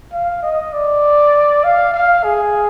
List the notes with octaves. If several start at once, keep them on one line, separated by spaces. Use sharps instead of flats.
F5
D#5
D5
F5
F5
G#4